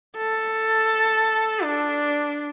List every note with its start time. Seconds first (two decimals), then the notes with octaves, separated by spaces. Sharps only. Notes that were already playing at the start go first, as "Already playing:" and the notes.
0.17 A4
1.64 D4